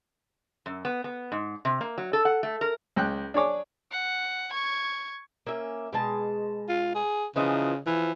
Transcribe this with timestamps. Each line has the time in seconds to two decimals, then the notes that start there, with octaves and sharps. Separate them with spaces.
0.66 F#2
0.85 B3
1.04 B3
1.32 G#2
1.65 C3
1.81 A#3
1.98 F#3
2.13 A4
2.25 F#5
2.43 A3
2.61 A#4
2.96 C#2 G5 F#6
3.34 D4 G#4 C#5 D6
3.91 F#5
4.50 C#6 G#6
5.47 A#3 C#4 E5
5.93 B2 G#3 A5
6.69 F4
6.95 G#4
7.36 C#3 E3 F3 D#4
7.86 E3 F3